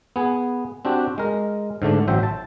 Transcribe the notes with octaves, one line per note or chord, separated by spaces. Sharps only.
B3 G#4
C4 D4 F#4 G4
G#3 A#4
G#2 D3 A3 D4
A1 F#3 C5 E5 G5
A5